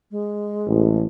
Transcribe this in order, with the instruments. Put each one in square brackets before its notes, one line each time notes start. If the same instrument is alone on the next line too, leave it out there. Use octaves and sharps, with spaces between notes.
[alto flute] G#3
[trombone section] A1